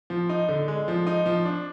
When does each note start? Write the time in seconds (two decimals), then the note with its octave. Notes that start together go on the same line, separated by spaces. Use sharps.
0.10 F3
0.29 D#4
0.49 D3
0.68 G#3
0.88 F3
1.07 D#4
1.26 F3
1.45 D4